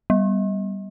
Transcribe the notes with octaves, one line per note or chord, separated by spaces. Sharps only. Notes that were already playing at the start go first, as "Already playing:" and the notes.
G3